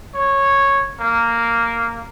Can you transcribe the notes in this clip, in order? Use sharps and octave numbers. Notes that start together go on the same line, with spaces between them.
C#5
A#3